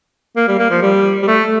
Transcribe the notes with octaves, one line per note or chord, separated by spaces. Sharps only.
A#3
G3
A#3
F3
G3
G3
A3